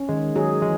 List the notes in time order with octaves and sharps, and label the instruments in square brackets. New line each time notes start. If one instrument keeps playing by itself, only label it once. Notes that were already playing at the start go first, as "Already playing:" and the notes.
Already playing: [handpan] C#4
[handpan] D#3 [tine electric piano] G#3
[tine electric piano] F#3 [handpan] G#4
[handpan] E3 [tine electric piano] G#3